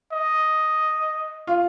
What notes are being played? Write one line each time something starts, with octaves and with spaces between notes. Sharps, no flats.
D#5
F4